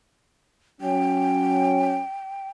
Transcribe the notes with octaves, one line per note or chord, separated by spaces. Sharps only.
F#3 C#4 G5